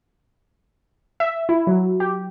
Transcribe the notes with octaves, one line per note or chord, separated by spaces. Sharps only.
E5
E4
F#3
G4